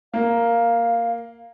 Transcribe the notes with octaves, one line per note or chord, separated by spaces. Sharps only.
A#3 F5